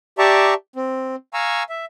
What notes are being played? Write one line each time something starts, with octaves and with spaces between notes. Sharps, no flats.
G4 D5 E5 A5 A#5 C#6
C4
F5 G#5 A#5 C#6 E6
E5